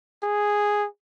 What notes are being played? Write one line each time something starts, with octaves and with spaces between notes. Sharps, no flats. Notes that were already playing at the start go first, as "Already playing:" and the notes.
G#4